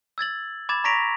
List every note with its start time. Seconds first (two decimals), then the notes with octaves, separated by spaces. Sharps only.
0.18 E6 G#6 A6 F#7
0.69 B5 D6 G#6 A6 E7
0.84 A#5 C#6 A#6 B6 D7 F7